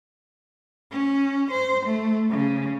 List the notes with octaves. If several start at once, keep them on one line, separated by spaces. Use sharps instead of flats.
C#4
C5
A3
C#3